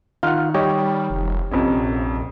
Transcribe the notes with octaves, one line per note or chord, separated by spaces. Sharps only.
D#3 F4 F#5 F6
G3 G4 C#5 D#5
F1
A#1 F2 C3 C#4